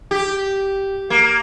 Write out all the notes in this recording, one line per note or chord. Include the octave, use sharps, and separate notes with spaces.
G4
A#3